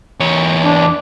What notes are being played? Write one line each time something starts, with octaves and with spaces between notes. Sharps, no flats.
E2 C#5
D4